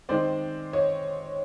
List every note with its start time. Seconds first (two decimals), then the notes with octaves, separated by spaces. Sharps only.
0.09 D#3 G#3 C4 C5 D5
0.73 C#5 D#5